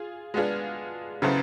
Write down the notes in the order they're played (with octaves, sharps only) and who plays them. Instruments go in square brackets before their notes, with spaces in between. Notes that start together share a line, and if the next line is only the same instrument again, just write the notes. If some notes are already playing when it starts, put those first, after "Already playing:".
Already playing: [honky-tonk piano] F4 G#4
G#3 B3 D4 F4 G#4
[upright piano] C#3 [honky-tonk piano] F#3 B3 E4 A4 C5